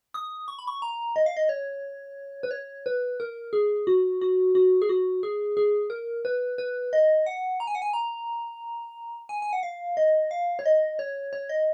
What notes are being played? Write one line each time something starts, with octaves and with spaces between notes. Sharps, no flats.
D#6
C#6
B5
C#6
A#5
D#5
F5
D#5
C#5
B4
C#5
B4
A#4
G#4
F#4
F#4
F#4
G#4
F#4
G#4
G#4
A#4
B4
B4
D#5
F#5
A#5
G#5
F#5
G#5
A#5
G#5
G#5
F#5
F5
D#5
F5
C#5
D#5
C#5
C#5
D#5